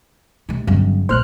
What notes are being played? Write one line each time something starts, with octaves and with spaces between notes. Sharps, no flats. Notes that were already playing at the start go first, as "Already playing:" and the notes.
C3 G#3
G1 C#3 F#3
A#1 A#2 C5 F6 F#6